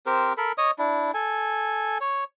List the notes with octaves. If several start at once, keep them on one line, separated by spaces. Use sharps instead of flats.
C4 G4 A#4 C5
A4 A#4 B5
C#5 D#5 D#6
D4 E4
A4 G#5
C#5